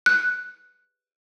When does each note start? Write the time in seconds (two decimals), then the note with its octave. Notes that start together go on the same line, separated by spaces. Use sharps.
0.06 F#6